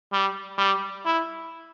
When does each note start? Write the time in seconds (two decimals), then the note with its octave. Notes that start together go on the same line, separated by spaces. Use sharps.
0.12 G3
0.58 G3
1.05 E4